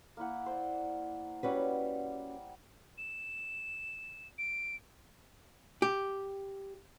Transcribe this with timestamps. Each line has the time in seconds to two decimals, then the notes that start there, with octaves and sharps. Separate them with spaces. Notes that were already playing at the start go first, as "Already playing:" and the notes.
0.17 A#3 E4 F#5
0.46 C5 D5
1.43 G3 C#4 F#4 B4 F#5
2.98 E7
4.38 D7
5.82 G4